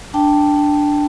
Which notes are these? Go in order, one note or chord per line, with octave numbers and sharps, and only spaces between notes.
D4 G5 A5
D4